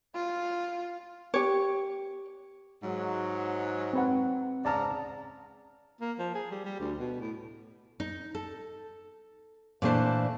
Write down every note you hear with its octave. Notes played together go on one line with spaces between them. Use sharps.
F4
G4 C#5
G#2 F#3
C4 B4 F#5
G#2 C#3 D5 A5 A#5 F6
A#3
F3
G#4
G3
G3
D2
B2
A2
D#4
A4
A#2 E3 A3 D4 C5 A5